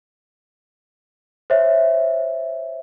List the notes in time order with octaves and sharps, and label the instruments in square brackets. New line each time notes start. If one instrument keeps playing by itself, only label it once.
[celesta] C5 C#5 E5